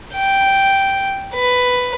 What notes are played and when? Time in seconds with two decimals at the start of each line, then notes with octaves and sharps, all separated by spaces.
0.14 G5
1.34 B4